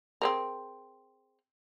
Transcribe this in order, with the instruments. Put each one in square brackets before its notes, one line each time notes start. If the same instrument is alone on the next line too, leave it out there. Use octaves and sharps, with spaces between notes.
[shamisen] C4 G#4 A#4